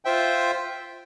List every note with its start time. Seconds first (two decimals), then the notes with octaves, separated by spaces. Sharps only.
0.05 F4 C5 E5 G5